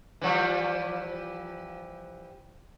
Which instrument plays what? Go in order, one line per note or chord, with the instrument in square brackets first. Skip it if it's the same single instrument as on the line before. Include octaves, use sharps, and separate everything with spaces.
[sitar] E3 F3 G3